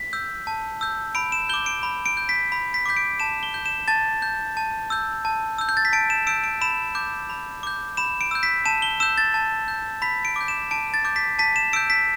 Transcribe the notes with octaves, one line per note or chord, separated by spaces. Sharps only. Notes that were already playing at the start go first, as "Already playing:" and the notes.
Already playing: B6
E6 G6
A5
E6 G6
B5 D7
E7
D6 G6 G7
D7
B5
D7
G6
B6
B5
B6
D6 G6 B6
D7
A5 E7
G7
G6
E7
A5 A6
G6
A5
E6 G6
A5
E6 G6
G6
A6
B6
A5 D7
E7
E6 G6 D7
D7
B5 E7
D6 G6
B5
D6 G6
B5 E7
D7
E6 G6
B6
A5 E7
G7
E6 G6 E7
A6
A5
G6
B5 B6
D7
D6 G6
E7
A5 D7
A6
D6 G6
B6
A5 B6
E7
E6 G6 D7
B6